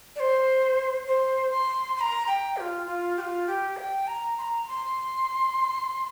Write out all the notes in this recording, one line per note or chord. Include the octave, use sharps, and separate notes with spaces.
D5
C5
C5
C6
C6
A#5
G5
G4
F4
F4
G4
F4
G4
G5
A#5
C6
A#5
C6